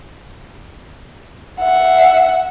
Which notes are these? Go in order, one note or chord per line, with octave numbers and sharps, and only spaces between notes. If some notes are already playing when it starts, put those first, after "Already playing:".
E5 F#5